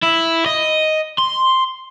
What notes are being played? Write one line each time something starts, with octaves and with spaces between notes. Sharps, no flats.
E4
D#5
C6